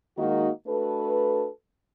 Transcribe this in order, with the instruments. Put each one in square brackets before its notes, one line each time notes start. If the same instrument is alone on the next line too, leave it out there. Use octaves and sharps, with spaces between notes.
[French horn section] D#3 G#3 A#3 D#4 F#4
A3 D4 F#4 A4 B4